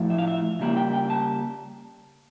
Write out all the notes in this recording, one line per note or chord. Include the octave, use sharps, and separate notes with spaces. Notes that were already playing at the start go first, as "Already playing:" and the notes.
Already playing: A2 F3 A3 E4
E5
F5
E5
C#3 G3 A#3 E4
G5
G5
A5